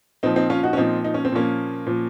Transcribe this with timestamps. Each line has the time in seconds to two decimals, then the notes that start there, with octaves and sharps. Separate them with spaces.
0.23 A#2 F3 C4 D#4
0.36 C4 D#4
0.50 C#4 F4
0.63 D#4 F#4
0.73 C#4
0.77 A#2 F3 C4 D#4
1.05 D#4
1.14 C#4
1.25 C4
1.32 A#2 F3 A#3 C#4
1.86 A#2 F3